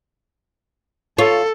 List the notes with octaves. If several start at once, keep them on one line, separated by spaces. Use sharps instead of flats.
F4 A4 C#5